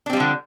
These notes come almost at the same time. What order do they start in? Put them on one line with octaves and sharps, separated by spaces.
D4 C4 G3 F3 D3